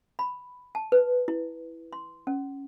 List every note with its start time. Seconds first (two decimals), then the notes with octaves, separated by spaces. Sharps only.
0.19 B5
0.75 A5
0.92 B4
1.28 E4
1.93 C6
2.27 C#4